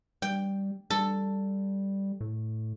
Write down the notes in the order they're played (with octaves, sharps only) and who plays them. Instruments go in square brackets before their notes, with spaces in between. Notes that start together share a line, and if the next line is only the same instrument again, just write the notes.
[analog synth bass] G3 [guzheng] G5
[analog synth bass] G3 [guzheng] A4
[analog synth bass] A2